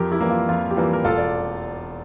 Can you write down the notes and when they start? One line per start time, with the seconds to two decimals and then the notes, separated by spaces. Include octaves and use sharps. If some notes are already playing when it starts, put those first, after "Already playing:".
Already playing: F2 G4 A#4
0.12 E4 G4
0.21 E3 G3 A#3
0.31 F4
0.49 F2 F4
0.71 G4
0.77 E3 G3 A#3 F4
0.93 A#4
1.04 E1 F4 A4
1.18 D5